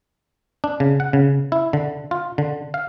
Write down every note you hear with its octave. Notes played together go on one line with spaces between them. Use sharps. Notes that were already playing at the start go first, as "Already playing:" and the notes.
D4
C#3
F#5
C#3
E4
D3
F4
D3
F5